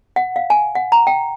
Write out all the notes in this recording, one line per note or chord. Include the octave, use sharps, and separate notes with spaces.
F#5
F5
G#5
F#5
A#5
G5